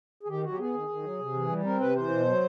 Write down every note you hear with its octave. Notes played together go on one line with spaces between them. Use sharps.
G#4
D#3 G4
F#3 F#4
G4
B3 G#4
D#3
D#3
F#3
C3
E3
G3
C4 A#4
C3 B4
E3 C5
B2
F#3